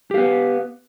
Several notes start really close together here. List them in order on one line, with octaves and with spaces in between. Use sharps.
G4 F5 B3